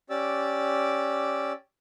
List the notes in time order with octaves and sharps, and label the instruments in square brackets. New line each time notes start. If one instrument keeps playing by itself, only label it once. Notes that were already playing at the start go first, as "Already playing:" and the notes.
[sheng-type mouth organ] C#4 G4 D5 D6 E6